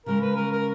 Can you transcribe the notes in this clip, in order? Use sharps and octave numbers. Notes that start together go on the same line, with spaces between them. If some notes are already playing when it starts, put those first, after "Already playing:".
C#3 G#3 C#4 A#4
B4
A#4
A#4